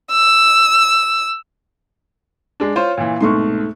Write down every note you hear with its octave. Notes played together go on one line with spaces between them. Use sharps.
E6
G#3 D4
F4 C5 C#5
A#2 E3
C2 G#2 B2 A3 C6 C#6